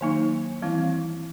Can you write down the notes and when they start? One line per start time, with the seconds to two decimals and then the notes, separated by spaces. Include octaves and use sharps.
0.01 D#3 F#3 A#3 D#4
0.62 E3 G3 C4 E4